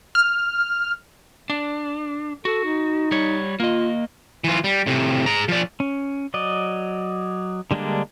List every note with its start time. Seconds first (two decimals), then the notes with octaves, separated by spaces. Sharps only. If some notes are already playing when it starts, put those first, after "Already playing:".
0.15 F6
1.50 D4
2.45 F#4 A4
2.64 D#4
3.11 G3 C#5
3.60 A#3 F4 D#5
4.44 E3 F4
4.64 G3
4.87 A2 C3
5.26 G#4 A#5
5.48 F3 D5
5.80 C#4
6.34 F#3 D5 D#5
7.71 D3 G3 G#3 A#3 D4